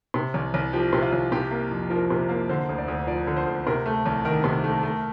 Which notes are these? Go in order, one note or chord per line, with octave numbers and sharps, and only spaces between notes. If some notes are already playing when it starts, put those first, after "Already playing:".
C3
C2
C2
F3 G4
C3
F4
C2
C3 G4
A#3
F2
F3 A#4
C3
A#3
D3 C5
D2
D5
D2
F3 D5
D3
C5
D2
C3 A#4
A3
C2
D#3 A#4
C3
A3
A3